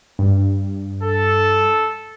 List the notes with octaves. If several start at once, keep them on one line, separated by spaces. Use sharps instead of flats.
G2
A4